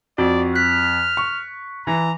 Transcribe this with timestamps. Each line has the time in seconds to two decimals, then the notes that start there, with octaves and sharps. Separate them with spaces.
0.18 F2 F#4 D5
0.55 F6 F#6 B6
1.17 C#6
1.87 E3 A#5